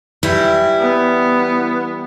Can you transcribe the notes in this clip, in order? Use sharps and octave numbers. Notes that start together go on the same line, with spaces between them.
E3 G3 E4
B3